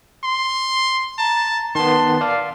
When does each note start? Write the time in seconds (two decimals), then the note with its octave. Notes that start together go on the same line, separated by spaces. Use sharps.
0.24 C6
1.19 A5 A#5
1.75 D#3 B3 A5 C6
2.21 D5 F5